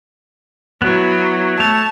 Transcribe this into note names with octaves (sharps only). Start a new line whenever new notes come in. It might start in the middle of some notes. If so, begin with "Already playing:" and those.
F#3 B3 E4
A3 C#5 A5